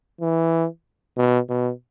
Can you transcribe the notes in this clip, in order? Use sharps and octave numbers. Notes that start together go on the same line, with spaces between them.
E3
B2
B2